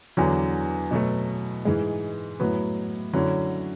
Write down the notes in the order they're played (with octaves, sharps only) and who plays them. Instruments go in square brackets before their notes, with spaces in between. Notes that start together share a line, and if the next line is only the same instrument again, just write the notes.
[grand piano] E2 D3 F#3
B2 F#3 A3
G#2 E3 G#3
A2 F#3 B3
D3 F#3 C#4 E4